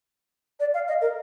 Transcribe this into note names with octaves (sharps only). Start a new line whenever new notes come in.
D5
F5
D#5
A#4